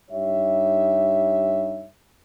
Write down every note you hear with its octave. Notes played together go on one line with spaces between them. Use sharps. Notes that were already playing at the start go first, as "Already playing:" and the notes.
G2 D#4 G4 C#5 E5